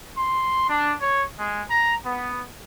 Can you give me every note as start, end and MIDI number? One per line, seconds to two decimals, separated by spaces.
0.17 0.64 84
0.69 0.93 62
1.00 1.23 73
1.38 1.63 56
1.70 1.94 82
2.05 2.42 59